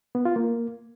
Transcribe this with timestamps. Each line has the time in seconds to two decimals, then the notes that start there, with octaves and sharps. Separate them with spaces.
0.15 B3
0.25 F4
0.36 A#3